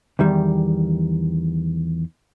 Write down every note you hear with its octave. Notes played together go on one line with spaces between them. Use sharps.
E2 D#3 G3